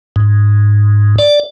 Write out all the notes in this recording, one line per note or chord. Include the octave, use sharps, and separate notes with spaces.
G#2
D5